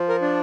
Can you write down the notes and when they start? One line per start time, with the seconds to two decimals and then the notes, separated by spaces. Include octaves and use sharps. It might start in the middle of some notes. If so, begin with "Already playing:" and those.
Already playing: F3
0.09 A#4
0.22 D4